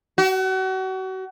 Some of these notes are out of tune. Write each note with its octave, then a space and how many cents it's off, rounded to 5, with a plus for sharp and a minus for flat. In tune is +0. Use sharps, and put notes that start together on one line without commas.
F#4 +35